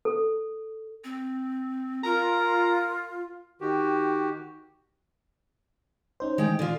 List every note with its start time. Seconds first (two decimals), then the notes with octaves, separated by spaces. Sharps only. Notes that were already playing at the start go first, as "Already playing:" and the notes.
0.05 A4
1.04 C4
2.04 F4 A#4 A#5
3.61 D#3 F#4 G4
6.20 C#4 D#4 C5
6.38 D#3 E3 G#3 G5
6.59 D3 F4